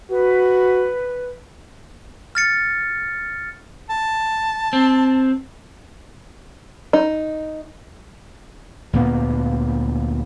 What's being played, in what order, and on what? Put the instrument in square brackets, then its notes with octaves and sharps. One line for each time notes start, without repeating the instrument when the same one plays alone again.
[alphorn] F#4 [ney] B4
[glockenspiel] F6 A6 C#7
[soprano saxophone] A5
[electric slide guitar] C4
[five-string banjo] D#4
[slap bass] D2 A#2 A#3 B3